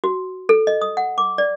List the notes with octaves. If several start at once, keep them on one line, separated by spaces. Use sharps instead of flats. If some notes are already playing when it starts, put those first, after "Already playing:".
F#4
A4
D#5
D#6
F#5
D6
D5